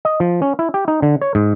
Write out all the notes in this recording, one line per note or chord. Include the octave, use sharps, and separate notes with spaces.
D#5
F3
C#4
E4
G4
D#4
D3
C#5
G#2